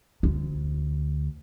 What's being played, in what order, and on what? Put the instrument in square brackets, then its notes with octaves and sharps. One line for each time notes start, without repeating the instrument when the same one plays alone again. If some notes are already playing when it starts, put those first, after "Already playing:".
[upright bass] D2